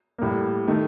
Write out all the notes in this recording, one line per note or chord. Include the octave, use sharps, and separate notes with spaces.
A2 G3 A#3
D#3 A3